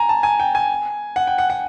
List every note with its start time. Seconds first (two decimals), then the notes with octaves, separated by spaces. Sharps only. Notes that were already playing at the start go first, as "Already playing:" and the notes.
Already playing: G#5 A#5
0.09 A5
0.23 G#5
0.40 G5
0.55 G#5
1.16 F#5
1.27 G5
1.38 F#5
1.50 F#5